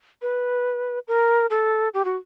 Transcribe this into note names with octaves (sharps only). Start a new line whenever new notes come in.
B4
A#4
A4
G4
F#4